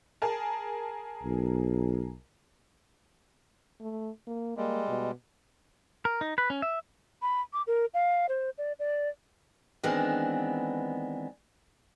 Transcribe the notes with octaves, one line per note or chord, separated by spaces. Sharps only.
G#4 A#4 A5
B1
A3
A#3
G3 G#3 A#3
B2
A#4
D#4
B4
C#4
E5
B5
D6
A#4
F5
C5
D5
D5
D#3 E3 G#3 B3 C4 D4